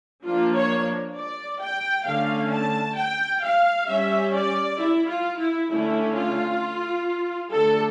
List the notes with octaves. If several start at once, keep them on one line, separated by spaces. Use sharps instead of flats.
F3 A#3 D4 F4
C#5
D5
G5
D3 A3 C#4 F5
A5
G5
F5
G3 C#4 E5
D5
E4
F4
E4
D3 A3 C#4 E4
F4
D3 A3 D4 A4